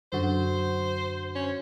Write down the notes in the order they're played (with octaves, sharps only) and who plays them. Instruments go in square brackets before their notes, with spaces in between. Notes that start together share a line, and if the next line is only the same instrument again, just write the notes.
[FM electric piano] F#2 D3 F#4 [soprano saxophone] C5
[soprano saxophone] C#4